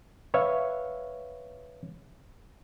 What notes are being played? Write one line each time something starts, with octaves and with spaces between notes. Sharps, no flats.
B4 C#5 E5 F5